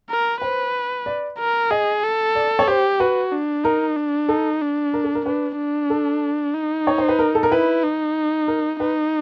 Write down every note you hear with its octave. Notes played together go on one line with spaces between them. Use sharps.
A#4
B4 C5
D5
A#4
G#4 D#5
A4
D5
C#5
G4 C5
F#4 B4
D4
D#4 A#4
D4
D#4 A4
D4
A#4
A4
A#4
D4 B4
D4
A4
D#4
C#5
C5
B4
A#4
A4
A#4
E4 B4
D#4
A#4
D#4 B4